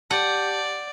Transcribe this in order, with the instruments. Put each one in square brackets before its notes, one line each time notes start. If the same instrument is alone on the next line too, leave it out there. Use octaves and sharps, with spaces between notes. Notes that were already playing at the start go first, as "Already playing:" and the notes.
[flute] G4 [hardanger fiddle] D5 [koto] F#5 [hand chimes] A5 G6